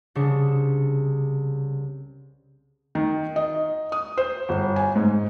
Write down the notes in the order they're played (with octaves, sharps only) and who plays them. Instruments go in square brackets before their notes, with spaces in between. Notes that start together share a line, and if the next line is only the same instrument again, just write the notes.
[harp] C2 C#3 D4 C#7
[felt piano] D#3
D#5
D#6
C5
G1
G#5
G#2